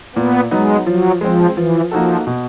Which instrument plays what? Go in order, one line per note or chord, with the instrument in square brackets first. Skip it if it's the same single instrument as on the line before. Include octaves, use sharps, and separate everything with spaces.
[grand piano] A#2 [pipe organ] B3
[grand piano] F#3 B3 D#4 [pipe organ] G#3
[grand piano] F3 [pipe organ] F#3
[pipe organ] F3 [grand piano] G#3 C4
[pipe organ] E3 [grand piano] F3
[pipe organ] F3 [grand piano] A#3 D#4 F#4 A4
[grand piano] B2